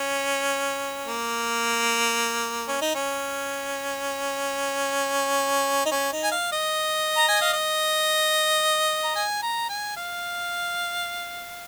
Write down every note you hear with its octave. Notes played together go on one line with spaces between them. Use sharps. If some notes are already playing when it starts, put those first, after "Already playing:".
Already playing: C#4
A#3
C#4
D#4
C#4
D#4
C#4
D#4
G#5
F5
D#5
A#5
G#5
F5
D#5
A#5
G#5
A#5
G#5
F5